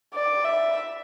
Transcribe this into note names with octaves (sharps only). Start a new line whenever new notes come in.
D5
E5